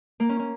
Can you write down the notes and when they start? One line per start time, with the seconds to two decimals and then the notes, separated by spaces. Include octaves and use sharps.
0.20 A#3
0.29 C#4
0.39 C#4